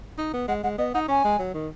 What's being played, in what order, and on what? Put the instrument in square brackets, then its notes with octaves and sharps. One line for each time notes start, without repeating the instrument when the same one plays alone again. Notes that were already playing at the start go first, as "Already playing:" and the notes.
[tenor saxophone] D#4
B3
[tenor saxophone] G#3 [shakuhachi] F#5
[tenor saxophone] G#3 [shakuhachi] F#5
[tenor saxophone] B3 [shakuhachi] D#5
[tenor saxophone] D#4 [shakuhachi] F#5
[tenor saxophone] C#4 [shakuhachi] G#5
[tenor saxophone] G#3
F#3
D#3